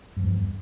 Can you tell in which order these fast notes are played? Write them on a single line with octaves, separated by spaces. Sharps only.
G2 F3 E2